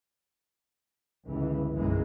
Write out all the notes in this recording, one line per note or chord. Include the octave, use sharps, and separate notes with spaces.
G1 C#2 E3
B1 F#2 E3 F#3 G#3 A#3